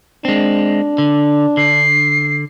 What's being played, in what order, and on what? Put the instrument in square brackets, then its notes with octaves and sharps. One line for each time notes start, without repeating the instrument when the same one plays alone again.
[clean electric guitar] G#3 C4 [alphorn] D4
[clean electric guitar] D3
[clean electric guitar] D3 [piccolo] C7